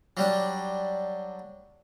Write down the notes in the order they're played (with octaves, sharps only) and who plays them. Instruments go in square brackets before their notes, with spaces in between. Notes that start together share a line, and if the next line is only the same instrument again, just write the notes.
[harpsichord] F#3 G3 D4